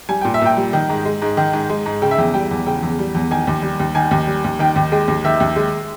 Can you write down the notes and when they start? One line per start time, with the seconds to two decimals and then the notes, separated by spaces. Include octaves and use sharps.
0.09 G3 G#5
0.21 A#2 G5
0.34 E5
0.41 A#2 G5
0.57 G3
0.73 D#3
0.90 G#2
1.05 G#3
1.22 G#2
1.37 D#3
1.53 G#2
1.70 G#3
1.86 G#2
2.02 C#3 G5
2.11 E5
2.18 E2 G5
2.34 G3 G5
2.51 E2
2.67 C#3 G5
2.83 E2
2.99 G3
3.15 E2
3.31 D#3 G#5
3.47 D#2
3.62 G3
3.80 D#2
3.95 D#3 G#5
4.11 D#2
4.27 G3
4.44 D#2
4.59 D#3 G5
4.76 D#2
4.92 G#3 G5
5.08 D#2
5.24 D#3 E5
5.40 D#2
5.56 G#3